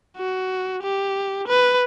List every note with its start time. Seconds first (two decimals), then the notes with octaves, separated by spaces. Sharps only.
0.17 F#4
0.82 G4
1.48 B4